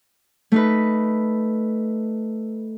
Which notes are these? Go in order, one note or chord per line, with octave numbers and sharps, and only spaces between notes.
A3 D#4 B4